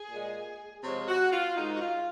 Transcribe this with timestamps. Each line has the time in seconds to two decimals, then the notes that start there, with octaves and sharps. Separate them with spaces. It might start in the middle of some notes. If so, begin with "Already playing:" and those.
Already playing: G#4
0.11 A#2 G#3
0.83 C3 F3 G#3 C#5
1.08 F#4
1.32 F4
1.56 G#2 D#3 G#3 D#4
1.75 F#4
1.81 F4